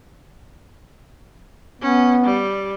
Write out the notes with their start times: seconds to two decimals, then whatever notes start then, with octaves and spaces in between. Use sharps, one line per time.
1.82 B3 C#4
2.24 G3